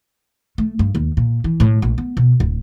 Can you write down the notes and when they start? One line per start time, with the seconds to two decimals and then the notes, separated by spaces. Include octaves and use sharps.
0.58 A3
0.79 G2
0.95 D#2
1.17 A#2
1.44 E3
1.60 A2
1.82 A#1
1.98 B3
2.17 B2
2.40 D1